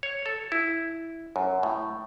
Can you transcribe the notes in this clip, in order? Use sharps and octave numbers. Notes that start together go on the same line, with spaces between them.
C#5
A4
E4
F#2
A2